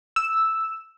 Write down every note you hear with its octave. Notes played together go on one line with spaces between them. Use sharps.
E6